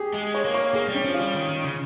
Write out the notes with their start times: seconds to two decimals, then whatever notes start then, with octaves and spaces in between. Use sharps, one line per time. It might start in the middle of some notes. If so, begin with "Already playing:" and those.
Already playing: G4 G#4
0.14 G#3
0.34 C#5
0.45 A#3
0.54 C#5
0.74 A#3 G#4
0.89 G3
0.94 C#4
1.04 F3
1.14 F4
1.20 G3
1.34 D#3
1.49 D#3
1.64 C#3